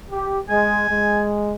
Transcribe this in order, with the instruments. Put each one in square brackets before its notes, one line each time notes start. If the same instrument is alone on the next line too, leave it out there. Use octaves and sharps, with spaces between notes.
[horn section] G4
[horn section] G#3 [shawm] G#5
[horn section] G#3